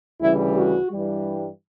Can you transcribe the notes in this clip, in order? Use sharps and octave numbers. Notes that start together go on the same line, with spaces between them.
D2 C#3 E3 G3 E4
F#4
G2 E3 G3